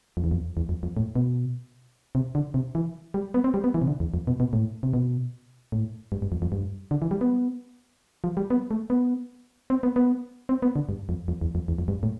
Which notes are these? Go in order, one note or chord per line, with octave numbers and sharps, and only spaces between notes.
F2
E2
F2
E2
F2
F2
A2
B2
C3
D3
C3
E3
G3
B3
C4
G3
B3
E3
C3
D3
E2
F2
B2
B2
A2
C3
B2
A2
G2
G2
F2
F2
G2
D3
E3
G3
B3
F3
G3
B3
A3
B3
C4
B3
B3
C4
B3
D3
G2
F2
F2
E2
F2
E2
F2
G2
A2